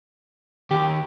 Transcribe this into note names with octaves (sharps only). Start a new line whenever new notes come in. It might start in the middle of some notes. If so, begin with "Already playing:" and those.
D#2 G4